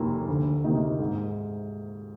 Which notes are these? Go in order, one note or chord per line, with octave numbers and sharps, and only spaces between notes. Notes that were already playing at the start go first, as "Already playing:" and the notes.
Already playing: F1 D#2 D#3 A#3
D2
C3 D#3 A#3 D#4
G#2